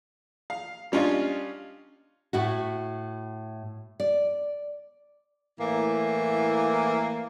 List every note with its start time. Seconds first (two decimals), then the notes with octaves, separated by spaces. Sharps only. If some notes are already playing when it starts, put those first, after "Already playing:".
0.50 F5
0.92 G3 C#4 D4 F4 D#5 F5
2.33 A2 E4 F#4
4.00 D5
5.59 A2 E3 A#3